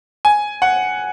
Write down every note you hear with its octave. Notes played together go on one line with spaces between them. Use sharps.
G#5
F#5